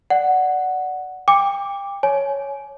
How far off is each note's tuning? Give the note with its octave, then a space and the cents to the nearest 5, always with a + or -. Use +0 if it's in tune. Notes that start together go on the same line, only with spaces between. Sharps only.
D5 +0 F#5 +0
G5 +30 D6 +0
C#5 +0 G#5 +25